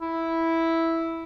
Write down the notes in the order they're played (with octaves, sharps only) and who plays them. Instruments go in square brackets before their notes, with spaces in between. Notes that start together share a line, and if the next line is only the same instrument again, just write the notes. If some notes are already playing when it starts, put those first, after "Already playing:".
[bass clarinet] E4